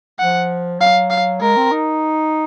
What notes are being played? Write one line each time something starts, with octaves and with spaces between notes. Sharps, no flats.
F3 F#5
F#3 F5
F5
G#3 A#4
C4
D#4